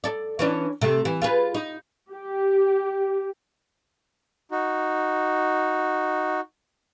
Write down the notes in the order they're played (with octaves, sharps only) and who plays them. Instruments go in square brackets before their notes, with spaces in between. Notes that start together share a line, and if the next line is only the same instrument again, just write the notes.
[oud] A4 D5
E3 C#4 D4
C3 A3
E3
F4 G#4 B4
D#4
[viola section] G4
[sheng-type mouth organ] D#4 F#4